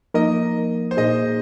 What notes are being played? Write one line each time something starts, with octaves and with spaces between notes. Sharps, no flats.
F3 A#3 D#4 A#4 D#5
C5
A#2 A#3 D#4 G#4 D#5